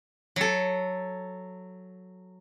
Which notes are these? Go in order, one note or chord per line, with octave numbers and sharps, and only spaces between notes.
F#3 A4